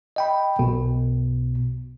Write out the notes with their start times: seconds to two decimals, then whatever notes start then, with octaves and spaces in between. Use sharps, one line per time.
0.16 D#5 G5 B5
0.59 B1 B2